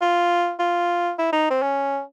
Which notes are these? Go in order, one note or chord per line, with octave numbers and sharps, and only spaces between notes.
F4
F4
E4
D#4
C4
C#4